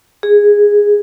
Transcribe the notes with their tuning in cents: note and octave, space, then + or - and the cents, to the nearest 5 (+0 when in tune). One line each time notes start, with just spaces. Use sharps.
G#4 -10